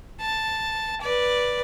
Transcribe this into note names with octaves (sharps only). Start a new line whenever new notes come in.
A5
B4 D5